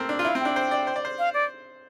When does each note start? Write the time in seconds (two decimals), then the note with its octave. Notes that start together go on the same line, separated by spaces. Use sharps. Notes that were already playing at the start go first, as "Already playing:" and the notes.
Already playing: A3 A#3 C4
0.09 D4
0.19 F4
0.24 E4 F5
0.35 C4
0.40 D4 G5
0.56 C5
0.71 D5
0.87 C5
0.96 D5
1.05 C5
1.19 F5
1.34 D5